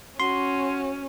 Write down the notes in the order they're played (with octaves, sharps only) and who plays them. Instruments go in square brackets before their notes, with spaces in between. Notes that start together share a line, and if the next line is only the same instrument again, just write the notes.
[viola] C#4 [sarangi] F#4 [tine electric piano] C6